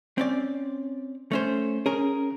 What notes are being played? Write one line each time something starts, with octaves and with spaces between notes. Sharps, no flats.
C4 C#4 D5
A3 C#4 C5
C#4 G#4 A#4